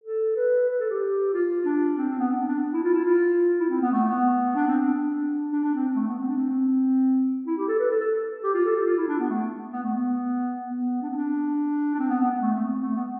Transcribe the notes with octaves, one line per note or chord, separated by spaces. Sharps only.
A4
B4
B4
A4
G4
F4
D4
C4
C4
B3
D4
C4
D4
E4
F4
E4
F4
E4
C4
B3
A3
B3
D4
C4
D4
D4
D4
C4
A3
B3
C4
D4
C4
E4
G4
A4
B4
A4
A4
G4
F4
A4
G4
F4
E4
D4
B3
A3
B3
A3
B3
B3
D4
C4
D4
D4
C4
B3
B3
B3
A3
A3
C4
A3
B3